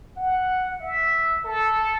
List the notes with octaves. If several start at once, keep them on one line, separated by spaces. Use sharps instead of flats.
F#5
E5
A4